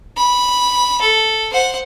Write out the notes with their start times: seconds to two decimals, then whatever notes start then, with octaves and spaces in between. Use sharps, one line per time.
0.17 B5
1.01 A4
1.53 C5 F#5